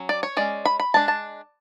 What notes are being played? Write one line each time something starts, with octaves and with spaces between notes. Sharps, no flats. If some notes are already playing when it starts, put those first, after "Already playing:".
Already playing: F#3 C#4
D5
C#5
G#3 C#4 D5
B5
B5
G#3 D4 A5
A5